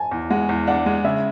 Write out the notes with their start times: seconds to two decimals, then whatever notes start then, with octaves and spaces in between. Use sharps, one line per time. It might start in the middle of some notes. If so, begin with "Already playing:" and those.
Already playing: G#5 A5
0.11 E2
0.30 G#3 F#5
0.49 E2
0.67 D4 F#5
0.86 G#3
1.04 C#3 E5